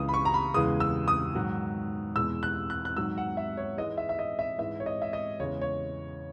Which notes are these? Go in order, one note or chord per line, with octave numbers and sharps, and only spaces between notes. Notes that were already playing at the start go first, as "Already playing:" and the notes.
Already playing: C#2 C#3 E3 D#6
B5
C#6
A#5
B5
E2 C#3 E3 G#3 D#6
E6
D#6
G#2 D#3 F#3
E2 B2 G#3 E6
F#6
F#6
F#6
G#2 D#3 F#3 E6
F#5
E5
C#5
G#2 E3 G#3 D#5
E5
E5
D#5
E5
G#2 E3 G#3 E5
C#5
D#5
E5
D#5
E2 C#3 G#3 C#5
C#5